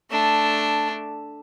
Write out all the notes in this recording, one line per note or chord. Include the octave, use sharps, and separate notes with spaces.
A3 D4